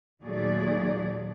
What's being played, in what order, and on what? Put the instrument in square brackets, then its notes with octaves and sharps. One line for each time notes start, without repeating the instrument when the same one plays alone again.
[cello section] D#2 A#2 F#3 A3 G#4 D5